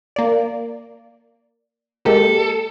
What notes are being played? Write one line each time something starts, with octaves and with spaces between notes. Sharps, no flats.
A#3 D5
G#3 A#3 G4 A4